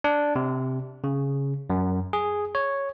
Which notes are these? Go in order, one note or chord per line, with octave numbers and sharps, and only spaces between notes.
D4
C3
C#3
F#2
G#4
C#5